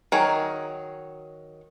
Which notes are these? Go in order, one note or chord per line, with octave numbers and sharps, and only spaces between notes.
D#3 F#3 G#4